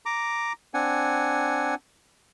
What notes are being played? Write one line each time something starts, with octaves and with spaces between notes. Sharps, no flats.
A#5 D6
C4 D4 F#5 G#5